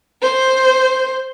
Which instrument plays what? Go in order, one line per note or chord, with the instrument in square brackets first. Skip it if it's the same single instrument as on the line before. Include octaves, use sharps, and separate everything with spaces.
[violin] C5